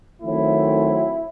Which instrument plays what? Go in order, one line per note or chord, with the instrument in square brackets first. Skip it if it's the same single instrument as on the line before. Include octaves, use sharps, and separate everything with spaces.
[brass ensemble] D#3 F#3 A3 C4 E4